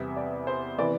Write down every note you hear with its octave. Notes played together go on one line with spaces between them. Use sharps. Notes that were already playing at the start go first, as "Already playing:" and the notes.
Already playing: E2 C3 G3 E5
D5
C5
C3 E3 B3 D5